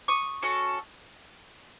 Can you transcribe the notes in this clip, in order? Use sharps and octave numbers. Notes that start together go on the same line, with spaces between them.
C#6 D#6
C#4 F#4 A4